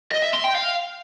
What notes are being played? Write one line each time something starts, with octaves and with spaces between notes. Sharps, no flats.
D#5
E5
C6
G5
F5